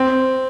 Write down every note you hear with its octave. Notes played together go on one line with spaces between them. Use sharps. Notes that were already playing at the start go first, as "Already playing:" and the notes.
Already playing: C4